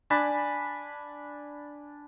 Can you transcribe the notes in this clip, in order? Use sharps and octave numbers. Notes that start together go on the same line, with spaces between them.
D4 G#5 A5 B5